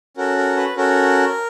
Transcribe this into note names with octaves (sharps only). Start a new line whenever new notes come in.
C#4 F#4 A4 A#4
A#4
B4
C#4 F#4 A4 A#4